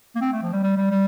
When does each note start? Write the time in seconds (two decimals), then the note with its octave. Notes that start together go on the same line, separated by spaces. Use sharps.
0.16 A#3
0.21 C4
0.33 A3
0.42 F3
0.53 G3
0.63 G3
0.77 G3
0.91 G3